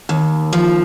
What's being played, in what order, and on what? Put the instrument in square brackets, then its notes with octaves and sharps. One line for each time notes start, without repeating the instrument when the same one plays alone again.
[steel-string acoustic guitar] D#2
F3